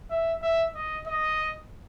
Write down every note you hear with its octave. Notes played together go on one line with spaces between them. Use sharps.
E5
E5
D#5
D#5